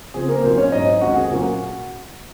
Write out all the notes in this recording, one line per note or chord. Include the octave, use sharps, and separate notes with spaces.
C#3 F3 C4 G#4
A#3 A#4
A#2 F#3 C4 D#4 C5
C#4 C#5
G#2 F#3 C#4 D#4 D#5
F2 D#3 G#3 C#4 F#4 F#5
G#4
A#2 F#3 A#3 C#4 F#4